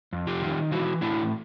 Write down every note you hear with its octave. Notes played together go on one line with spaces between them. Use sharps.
F2
F4 G4
D#3
E3 E4 F#4
A2 D4 E4